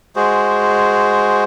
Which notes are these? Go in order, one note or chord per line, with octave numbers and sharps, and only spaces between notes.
G#3 F#4 G#4 C5